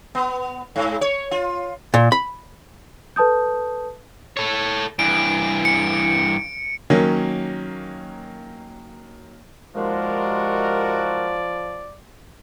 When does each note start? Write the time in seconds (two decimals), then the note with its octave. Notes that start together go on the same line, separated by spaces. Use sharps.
0.15 B3
0.76 G#2
1.01 C#5
1.31 F4
1.94 A#2
2.12 B5
3.16 A4 B4 A5 D#6 G6
4.37 A4 C#5
4.99 G2 E3 D7
5.65 C#7
6.90 D#3 F#3 A#3 C#4
9.76 D#2 F3 G#3 F#4 A#4 D5